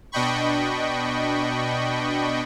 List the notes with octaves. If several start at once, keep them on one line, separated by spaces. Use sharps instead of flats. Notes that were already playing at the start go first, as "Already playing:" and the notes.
B2 D4 D#5 G5 B5 C#6